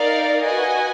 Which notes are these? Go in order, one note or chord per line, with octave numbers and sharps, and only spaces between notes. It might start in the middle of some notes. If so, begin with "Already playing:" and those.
Already playing: D#4 A#4 D5 F5
F#4 B4 D#5 G#5